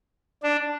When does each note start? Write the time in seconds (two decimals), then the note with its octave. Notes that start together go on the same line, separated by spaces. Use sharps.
0.43 D4